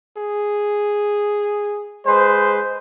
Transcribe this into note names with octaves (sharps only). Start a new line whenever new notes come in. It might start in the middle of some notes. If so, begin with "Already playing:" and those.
G#4
G#3 B4 C5